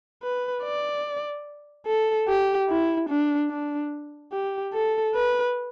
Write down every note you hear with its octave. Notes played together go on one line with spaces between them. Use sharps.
B4
D5
A4
G4
E4
D4
D4
G4
A4
B4